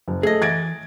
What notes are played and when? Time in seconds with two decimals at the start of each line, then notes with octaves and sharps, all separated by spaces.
0.08 F#1
0.23 A3 G#4 D#5
0.42 E3 G#6 A6 D7